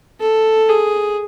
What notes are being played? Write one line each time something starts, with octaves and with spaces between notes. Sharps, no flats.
A4
G#4